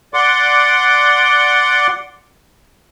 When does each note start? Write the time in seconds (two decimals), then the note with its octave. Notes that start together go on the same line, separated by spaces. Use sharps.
0.14 D5 F#5 C6 D6